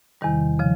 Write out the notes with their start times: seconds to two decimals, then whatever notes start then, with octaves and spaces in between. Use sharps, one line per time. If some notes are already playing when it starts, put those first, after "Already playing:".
0.21 E2 C3 D#3 G3
0.59 C#3 F3